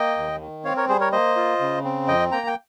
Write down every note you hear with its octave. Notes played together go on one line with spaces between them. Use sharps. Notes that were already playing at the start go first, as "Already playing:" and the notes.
Already playing: A#3 D#5 G5
D#2
D#3
C4 C#5 F5
A#4 C#5
G3 G#4 C5
A#4 C#5
A#3 C5 D#5
F4
C#3
C4
F2 D#5 G5
A#3 G5 A#5
G5